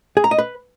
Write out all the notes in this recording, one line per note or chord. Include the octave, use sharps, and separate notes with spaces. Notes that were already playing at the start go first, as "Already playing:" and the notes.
G#4
A#5
D#5
B4